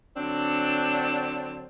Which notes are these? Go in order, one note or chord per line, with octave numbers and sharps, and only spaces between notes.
D3 F#3 C4 D4